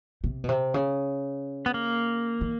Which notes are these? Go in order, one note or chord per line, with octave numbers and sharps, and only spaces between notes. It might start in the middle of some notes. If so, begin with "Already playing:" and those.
C3
B2
C3
C#3
B3
A#3
D#3